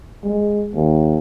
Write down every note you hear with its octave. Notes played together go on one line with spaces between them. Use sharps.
G#3
D#2